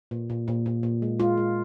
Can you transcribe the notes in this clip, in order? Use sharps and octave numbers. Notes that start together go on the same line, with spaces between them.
A#2
A#2
A#2
A#2
A#2
G#3
G#3 F4
G#3